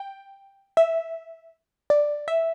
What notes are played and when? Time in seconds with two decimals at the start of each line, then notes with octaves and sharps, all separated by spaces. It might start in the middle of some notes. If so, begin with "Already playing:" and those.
Already playing: G5
0.77 E5
1.90 D5
2.28 E5